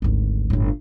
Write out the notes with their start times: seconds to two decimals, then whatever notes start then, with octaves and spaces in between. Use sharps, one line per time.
0.02 G#1 D2
0.50 G1 A2